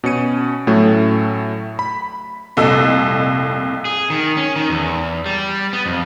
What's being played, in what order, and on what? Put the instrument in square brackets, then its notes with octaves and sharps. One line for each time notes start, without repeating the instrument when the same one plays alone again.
[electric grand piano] B2 C#4 C#7 D#7
A2 F#3 A3 C#4
B5
[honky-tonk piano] F1 C2 A#2 A4 D#5 E6
[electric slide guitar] G#4
D#3
C#4
D#3
E2
G3
B3
F2